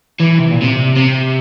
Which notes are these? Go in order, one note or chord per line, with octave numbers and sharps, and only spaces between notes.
E3
C3
A#2
C3
C3